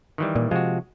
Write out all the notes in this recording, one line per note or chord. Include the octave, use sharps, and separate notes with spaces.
D#3 E3 G3
A#2
C3 F3 G#3 F#4